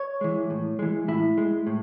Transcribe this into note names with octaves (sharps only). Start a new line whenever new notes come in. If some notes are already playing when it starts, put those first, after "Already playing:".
Already playing: C#5
E3 G#3
A2
E3 G#3
A2 E4
G#3
A2